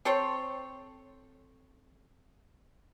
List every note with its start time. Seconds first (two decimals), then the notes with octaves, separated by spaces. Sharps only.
0.05 C4 A4 C5 C#5